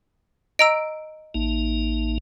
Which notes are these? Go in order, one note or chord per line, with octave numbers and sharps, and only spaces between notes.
D#5 A#5 E6 D7
A1 A#3 D#4